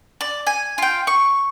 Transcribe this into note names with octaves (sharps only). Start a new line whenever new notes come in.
D5
G#5
F4 G5
C#6